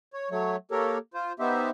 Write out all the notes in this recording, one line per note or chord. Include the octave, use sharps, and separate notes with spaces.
C#5
F#3 A3 C#5
A#3 G4 A4 A#4 C#5
F4 C5
B3 D#4 G4 C5 E5